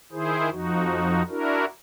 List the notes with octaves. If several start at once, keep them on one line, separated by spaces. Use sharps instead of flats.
D#3 E4 G#4 C5
F2 F3 D#4 F#4
D4 E4 F#4 A#4